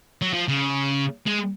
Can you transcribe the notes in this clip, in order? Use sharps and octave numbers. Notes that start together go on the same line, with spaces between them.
F#3
F3
C#3
G#3